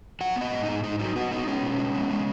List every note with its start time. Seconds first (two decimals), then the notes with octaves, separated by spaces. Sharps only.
0.21 F#3 F#5
0.36 B3
0.41 D#5
0.52 G#2
0.63 D#4
0.68 G#2
0.84 G#2 D#4
0.99 F#3 D#4
1.16 B3 F#4
1.31 B3 D#4
1.47 G#3 C#4
1.63 B2
1.79 G#3
1.95 B3
2.11 G#3